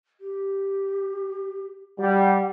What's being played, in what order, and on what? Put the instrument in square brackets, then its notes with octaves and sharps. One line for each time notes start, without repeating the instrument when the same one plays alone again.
[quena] G4
[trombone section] G3 [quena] F#5